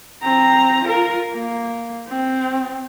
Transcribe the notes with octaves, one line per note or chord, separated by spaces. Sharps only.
C4 A#5
F4 A#4
A#3
C4